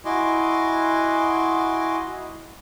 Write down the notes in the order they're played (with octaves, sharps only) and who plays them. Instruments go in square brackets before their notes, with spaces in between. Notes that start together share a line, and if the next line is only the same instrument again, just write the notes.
[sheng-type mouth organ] E4 F#4 D#5 G#5 C6 D6